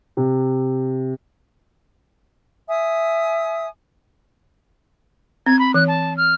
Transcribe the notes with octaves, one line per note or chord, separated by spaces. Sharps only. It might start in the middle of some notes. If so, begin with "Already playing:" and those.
C3
E5 G#5 D#6
C4 G#6
B5
E3 F#6
A5
F6